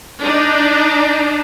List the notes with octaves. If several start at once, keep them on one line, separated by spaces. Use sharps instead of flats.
D4 D#4